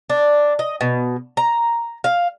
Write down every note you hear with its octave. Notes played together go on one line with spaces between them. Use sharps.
D4
D#5
B2
A#5
F5